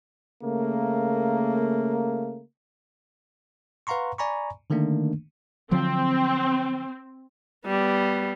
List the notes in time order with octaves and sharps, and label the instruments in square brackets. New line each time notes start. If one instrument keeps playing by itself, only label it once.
[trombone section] C#3 A3 A#3
[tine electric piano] B4 F5 F#5 A#5 C6 C#6
D5 G#5 A#5 B5 C#6
D3 D#3 A3 A#3 D4
[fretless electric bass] D3 F3 F#3 [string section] C4
[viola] G3 B3